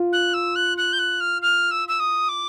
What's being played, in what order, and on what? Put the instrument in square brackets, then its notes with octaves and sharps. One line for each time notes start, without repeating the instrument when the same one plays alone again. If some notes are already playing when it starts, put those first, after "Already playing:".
Already playing: [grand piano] F4
[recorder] F#6
E6
F#6
F#6
G6
F#6
F6
F6
E6
E6
D#6
D6